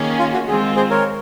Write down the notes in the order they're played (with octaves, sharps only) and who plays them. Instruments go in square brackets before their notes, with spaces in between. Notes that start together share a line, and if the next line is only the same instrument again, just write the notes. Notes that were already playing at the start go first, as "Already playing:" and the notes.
Already playing: [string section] D#3 A#3 C#4 G#4
[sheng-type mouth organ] F4
F#4
[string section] D#3 G#3 C4 F4 [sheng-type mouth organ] G#4
[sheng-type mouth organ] G#4 C5
A#4 C#5